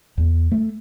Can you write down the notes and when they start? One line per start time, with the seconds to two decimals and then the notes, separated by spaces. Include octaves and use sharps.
0.18 E2
0.52 A3